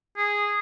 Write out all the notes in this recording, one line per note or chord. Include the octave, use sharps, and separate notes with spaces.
G#4